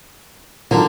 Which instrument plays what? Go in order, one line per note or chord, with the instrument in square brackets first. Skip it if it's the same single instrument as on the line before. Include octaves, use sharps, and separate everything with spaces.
[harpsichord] D3 A#3 [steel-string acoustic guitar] D#3 F#3 F4